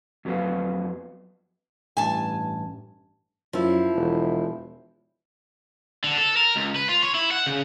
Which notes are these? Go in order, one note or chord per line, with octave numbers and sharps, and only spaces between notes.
F2 F#3 B3 F4 B4 F5
A1 G2 G#5 A5
F#2 F3 E4
E1
D3
A4
A#4
C#2
B4
F4
C#5
E4
F#5
C#3